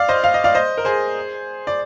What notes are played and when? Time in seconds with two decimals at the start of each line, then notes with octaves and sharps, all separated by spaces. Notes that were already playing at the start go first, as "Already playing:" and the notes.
Already playing: D5 F5
0.09 C5 D#5
0.24 F5
0.34 D#5
0.44 D5 F5
0.55 C5 D#5
0.78 A#4
0.85 G#4 C5
1.67 D5